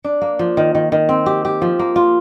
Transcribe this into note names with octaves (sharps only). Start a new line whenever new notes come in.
D4
A#3
F3
D#3
D#3
D#3
C4
G4
G4
F3
A#3
F4